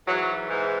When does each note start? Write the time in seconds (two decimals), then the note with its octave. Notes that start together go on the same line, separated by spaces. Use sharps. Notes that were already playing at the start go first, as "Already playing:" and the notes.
0.07 G#2 E3 F#3
0.49 G#2 E3